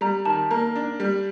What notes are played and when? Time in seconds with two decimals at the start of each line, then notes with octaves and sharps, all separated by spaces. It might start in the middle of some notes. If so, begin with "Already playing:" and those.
0.01 G3 A#5
0.25 D#3 A5
0.50 A#3 A#5
0.75 D4
1.00 G3